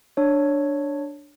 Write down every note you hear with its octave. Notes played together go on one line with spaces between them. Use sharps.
D4 C#5